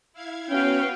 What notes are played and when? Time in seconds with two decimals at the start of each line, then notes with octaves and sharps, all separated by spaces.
0.13 E4 F5 G#6
0.50 B3 C#4 F#4 B4 C#5 F5 G5